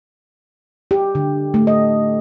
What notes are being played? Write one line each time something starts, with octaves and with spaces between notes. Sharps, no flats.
G4
D3
A3
D#5